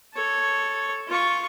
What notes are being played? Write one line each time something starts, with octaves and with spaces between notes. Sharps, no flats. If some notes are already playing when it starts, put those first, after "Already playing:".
A4 C#5
F4 C#6